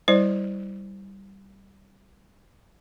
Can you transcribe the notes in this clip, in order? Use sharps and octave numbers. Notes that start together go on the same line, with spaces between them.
G3 E4 C5 D5